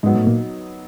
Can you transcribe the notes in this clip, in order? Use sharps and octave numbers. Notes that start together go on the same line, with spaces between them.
G#2 F#3 G#3 B3 D#4
A2 A3
A#2 A#3